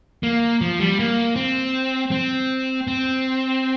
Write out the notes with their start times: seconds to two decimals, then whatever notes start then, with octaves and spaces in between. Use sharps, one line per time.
0.23 A#3
0.61 F3
0.80 G3
0.99 A#3
1.36 C4
2.12 C4
2.87 C4